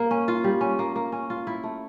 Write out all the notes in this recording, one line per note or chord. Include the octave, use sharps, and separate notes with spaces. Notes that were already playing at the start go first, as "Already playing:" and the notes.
Already playing: A#3
C#4
F4
G3
C#4
A#3
A#3
C#4
F4
E4
A3